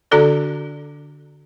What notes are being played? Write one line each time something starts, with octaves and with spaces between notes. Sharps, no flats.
D3 D4 F#4 A4 D5